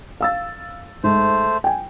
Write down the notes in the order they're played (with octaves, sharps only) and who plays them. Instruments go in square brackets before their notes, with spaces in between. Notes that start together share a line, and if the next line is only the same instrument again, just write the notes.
[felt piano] F5 E6 A6
[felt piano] G#2 [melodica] A3 C5
[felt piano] G5 G#5